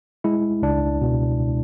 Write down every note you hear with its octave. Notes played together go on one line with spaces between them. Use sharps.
G#3 E4
C#2 D4
B2